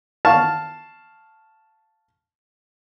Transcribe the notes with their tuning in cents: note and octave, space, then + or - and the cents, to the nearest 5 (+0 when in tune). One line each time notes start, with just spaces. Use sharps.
F5 +0 A5 +0 C#6 +0